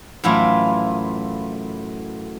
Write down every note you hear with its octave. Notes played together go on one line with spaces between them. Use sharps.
F#2 A2 E3 E4 F4